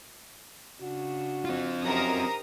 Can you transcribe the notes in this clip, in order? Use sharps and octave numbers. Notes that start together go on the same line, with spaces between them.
C#3 D4 F#4
C4 F4
F#2 D#4 G4 A#4 C5 A#5 D#6